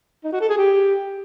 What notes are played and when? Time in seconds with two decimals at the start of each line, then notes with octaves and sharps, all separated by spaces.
0.24 D#4
0.32 F#4
0.41 A4
0.49 G#4
0.57 G4